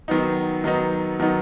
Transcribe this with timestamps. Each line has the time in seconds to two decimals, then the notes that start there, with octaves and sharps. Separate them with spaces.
0.08 D#3 F#3 B3 D#4
0.64 D#3 F#3 B3 D#4
1.20 D#3 F#3 B3 D#4